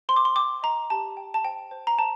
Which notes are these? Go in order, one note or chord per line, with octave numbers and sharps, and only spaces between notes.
C5 C6
D6
C6
G5 D6
D#5 A#5
G4 A5
G5
A5
C5 G5
C5
A#5
C5 A5